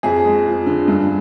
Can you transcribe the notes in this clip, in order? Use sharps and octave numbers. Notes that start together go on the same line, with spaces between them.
F2 G#4
G#3
F3
D3
G2